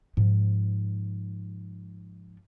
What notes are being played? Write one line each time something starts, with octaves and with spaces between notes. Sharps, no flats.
G#2 F3